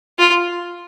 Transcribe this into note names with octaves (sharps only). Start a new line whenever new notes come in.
F4